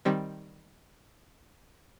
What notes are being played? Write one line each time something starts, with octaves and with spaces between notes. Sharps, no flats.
D#3 G3 C4